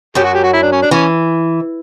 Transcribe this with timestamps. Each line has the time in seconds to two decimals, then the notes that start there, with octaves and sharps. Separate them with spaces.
0.15 F#2 F#3 G4
0.25 F#4
0.35 G4
0.44 F#4
0.53 E4
0.62 D4
0.72 C#4
0.82 D4
0.91 E3 C#4